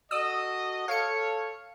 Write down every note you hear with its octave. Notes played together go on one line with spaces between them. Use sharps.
F#4 A4 D#5 D#6 E6
A4 C#5 F5 C#7